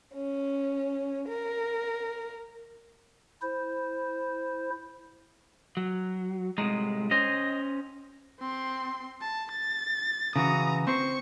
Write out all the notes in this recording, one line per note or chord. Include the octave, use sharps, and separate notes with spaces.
C#4
A#4
E4 C5
F#3
C2 A2 G#3 D#4
C#4 C5 D#5
C4 C6
A5
A6
C#3 E3 F#4 A#5 D#6
C4 C5 C#6